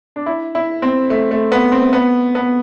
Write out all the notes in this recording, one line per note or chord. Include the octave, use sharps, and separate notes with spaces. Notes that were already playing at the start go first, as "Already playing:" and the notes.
D4
E4
E4
C4
A3
A3
B3
C4
B3
B3